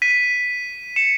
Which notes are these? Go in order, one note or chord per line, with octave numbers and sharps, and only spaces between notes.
B6 D#7
C#7 E7